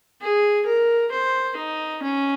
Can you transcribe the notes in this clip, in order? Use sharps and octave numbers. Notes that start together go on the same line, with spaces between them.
G#4
A#4
C5
D#4
C#4